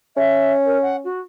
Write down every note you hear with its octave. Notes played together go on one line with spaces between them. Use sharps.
C#4 E5
A#4
F#5
F#4